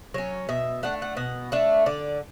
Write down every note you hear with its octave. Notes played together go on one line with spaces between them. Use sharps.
F#3 C#4 C#5
B2 E5
A3 D4 F#5
F#5
B2 F#5
A3 D4 E5
D3 D5